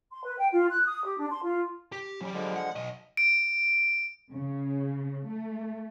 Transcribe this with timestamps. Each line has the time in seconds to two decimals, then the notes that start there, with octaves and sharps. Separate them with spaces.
0.11 C6
0.25 B4
0.38 G5
0.51 F4
0.70 F#6
0.84 D#6
1.04 G4
1.18 D4
1.30 C6
1.43 F4
1.92 G4
2.21 F#3 C#4 G4
2.34 D3 F3 G#3
2.56 F#5
2.76 B1 D#5
3.17 D7
4.31 C#3
5.27 A3